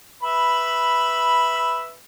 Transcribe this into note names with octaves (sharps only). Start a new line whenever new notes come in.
B4 E5 B5